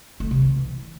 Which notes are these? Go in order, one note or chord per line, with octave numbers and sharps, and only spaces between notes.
A3
C3
E3